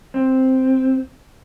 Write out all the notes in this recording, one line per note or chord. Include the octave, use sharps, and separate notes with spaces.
C4